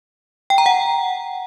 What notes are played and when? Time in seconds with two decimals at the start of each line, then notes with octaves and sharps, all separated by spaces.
0.50 G5
0.58 A#5
0.66 F#5